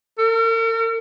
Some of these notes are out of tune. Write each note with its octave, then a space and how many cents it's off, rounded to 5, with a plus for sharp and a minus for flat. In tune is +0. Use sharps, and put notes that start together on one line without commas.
A#4 -45